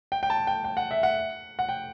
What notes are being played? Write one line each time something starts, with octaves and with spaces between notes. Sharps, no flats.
G5
G5
A5
G5
G5
F#5
E5
F#5
F#5
G5